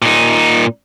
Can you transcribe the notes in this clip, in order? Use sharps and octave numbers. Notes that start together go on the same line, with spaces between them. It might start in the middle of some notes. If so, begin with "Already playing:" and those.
A#2 D#4